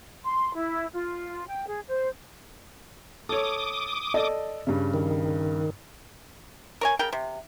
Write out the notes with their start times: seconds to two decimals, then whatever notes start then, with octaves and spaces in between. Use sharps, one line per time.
0.24 C6
0.55 E4
0.93 F4
1.48 G5
1.67 G#4
1.89 C5
3.29 A4 C#5 D6 D#6
4.14 A4 D5 D#5
4.67 G2 C#3
4.94 D#3
6.81 A#4 C#5 G#5
6.99 C#3 A#4 G5
7.13 C3